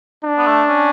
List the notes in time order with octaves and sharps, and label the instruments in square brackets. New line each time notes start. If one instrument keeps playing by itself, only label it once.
[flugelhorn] D4
[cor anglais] B3
A3
C#4